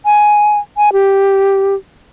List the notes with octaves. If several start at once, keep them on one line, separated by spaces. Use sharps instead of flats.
G#5
G#5
G4